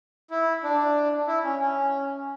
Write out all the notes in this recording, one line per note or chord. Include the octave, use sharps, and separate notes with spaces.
E4
D4
E4
C#4
C#4